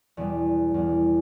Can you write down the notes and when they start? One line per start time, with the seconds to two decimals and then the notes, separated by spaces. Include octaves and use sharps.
0.17 E2 B2 G3
0.74 E2 B2 G3